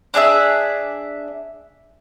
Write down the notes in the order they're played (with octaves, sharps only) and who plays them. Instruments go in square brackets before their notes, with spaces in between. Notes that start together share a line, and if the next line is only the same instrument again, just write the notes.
[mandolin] D4 G#4 D5 E5